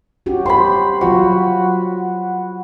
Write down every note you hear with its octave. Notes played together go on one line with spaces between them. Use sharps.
C#4 F#4 G4
G4 C5 B5 C6
F#3 F4 F#4 C5